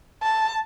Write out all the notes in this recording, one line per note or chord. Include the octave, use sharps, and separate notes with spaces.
A5